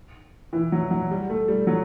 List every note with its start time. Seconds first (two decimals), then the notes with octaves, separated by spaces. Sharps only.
0.53 E3
0.72 F#3
0.91 F#3
1.11 G3
1.29 A3
1.48 G3
1.67 F#3